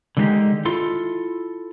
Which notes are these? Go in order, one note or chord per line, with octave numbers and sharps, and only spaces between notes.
D3 D#3 G#3 B3 D#4 G4
E4 F4 A4 C6